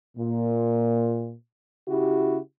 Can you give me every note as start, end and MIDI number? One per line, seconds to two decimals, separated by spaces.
0.18 1.34 46
1.88 2.37 49
1.88 2.37 64
1.88 2.37 66
1.88 2.37 67